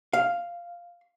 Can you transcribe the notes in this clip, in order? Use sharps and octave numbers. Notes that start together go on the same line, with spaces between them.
F5